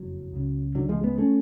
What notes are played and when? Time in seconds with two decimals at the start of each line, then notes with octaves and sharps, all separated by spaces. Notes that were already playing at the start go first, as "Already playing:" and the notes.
Already playing: F#1 F2 F#3
0.32 C#2 C#3
0.75 D3 F#3
0.89 F3 G#3
1.04 G#3 B3
1.18 A3 C#4